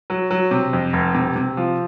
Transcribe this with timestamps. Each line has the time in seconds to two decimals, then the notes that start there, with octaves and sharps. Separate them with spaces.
0.10 F#3
0.31 F#3
0.51 C3
0.73 F2
0.93 F1
1.14 C3
1.36 C3
1.57 F3